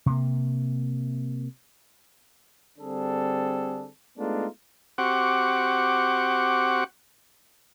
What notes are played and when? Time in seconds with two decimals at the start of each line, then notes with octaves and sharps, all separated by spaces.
0.06 C3 A#3
2.79 D3 G3 C4 D4 G#4 A4
4.17 G#3 A3 B3 D4 D#4 F4
4.98 C4 F#4 G4 F#5 C#6 D6